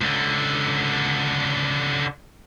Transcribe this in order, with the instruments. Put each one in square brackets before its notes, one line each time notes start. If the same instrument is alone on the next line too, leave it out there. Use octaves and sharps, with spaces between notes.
[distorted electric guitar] C#2 D3